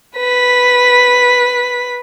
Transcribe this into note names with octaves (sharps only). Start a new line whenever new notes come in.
B4 B6